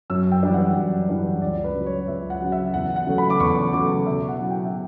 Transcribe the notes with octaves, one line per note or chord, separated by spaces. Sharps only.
F#2 E6
G5
E3 G3 D4
F#5
F#2
E3 G3 D4
C#2 D5
B4
C#3 F#3
C#5
C#2 E5
F#5
C#3 F#3
E5
E2 F#5
F#5
C#3 F#3 A3
B5
D6
E2 C#6
C#3 F#3 A3 D6
B2 E5
F#5
F#3 C#4 E4
G5
E5
B2